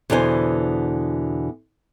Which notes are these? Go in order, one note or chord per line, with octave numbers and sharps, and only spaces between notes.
E2 B2 D3 A#4 C5 G#5